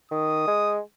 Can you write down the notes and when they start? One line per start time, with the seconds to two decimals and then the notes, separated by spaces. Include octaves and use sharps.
0.11 D#3 D#6
0.47 G#3